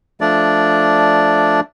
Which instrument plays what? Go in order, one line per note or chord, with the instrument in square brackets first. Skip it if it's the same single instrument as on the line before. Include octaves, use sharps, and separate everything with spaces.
[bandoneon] F3 A3 D4 D5